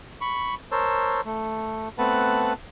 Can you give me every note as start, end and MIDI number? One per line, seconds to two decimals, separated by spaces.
0.21 0.55 83
0.21 0.55 85
0.72 1.21 70
0.72 1.21 72
0.72 1.21 73
0.72 1.21 81
0.72 1.21 88
1.25 1.89 57
1.98 2.53 57
1.98 2.53 59
1.98 2.53 60
1.98 2.53 71
1.98 2.53 78
1.98 2.53 81